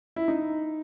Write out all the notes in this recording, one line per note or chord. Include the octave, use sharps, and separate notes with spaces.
E4
D#4